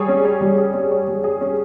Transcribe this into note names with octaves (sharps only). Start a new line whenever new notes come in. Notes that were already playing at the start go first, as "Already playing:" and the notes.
Already playing: G3 G#4 C#5
C#4
C#5
G3
G#4
C#4
C#5
G3
G#4
C#4